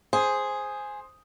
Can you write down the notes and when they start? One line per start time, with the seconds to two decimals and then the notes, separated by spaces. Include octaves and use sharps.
0.13 G#4 C5